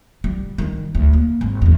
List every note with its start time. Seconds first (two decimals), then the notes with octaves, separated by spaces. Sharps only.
0.24 G3
0.58 D#3 G3
0.95 D2
1.13 A#3
1.41 G#1
1.62 F1 E2